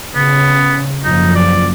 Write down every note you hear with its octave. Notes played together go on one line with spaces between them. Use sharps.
C#3 B3
F#1 F3 D#4
D5